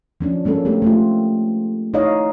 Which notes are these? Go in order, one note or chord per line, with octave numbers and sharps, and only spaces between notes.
F3 C#4 D4
G#3 A#3 C#4 A4
A3 C4 G4
A3 C4 F4
D#4 E4 C#5 D#5 F5